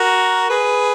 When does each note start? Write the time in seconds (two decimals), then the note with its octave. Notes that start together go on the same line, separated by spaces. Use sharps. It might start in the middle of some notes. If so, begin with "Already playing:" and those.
Already playing: F#4 A#4
0.50 G#4 B4